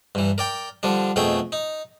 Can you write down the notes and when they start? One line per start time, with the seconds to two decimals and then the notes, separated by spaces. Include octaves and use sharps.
0.15 G2 E3
0.38 A#4 D5 G5
0.83 D3 F3 G3 D4
1.16 F2 B2 A3 G#4 G5
1.52 D#4